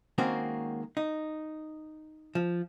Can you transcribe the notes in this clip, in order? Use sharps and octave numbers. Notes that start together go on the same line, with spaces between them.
D#3 G#3 A#3 C4 C#4 F#4
D#4
F3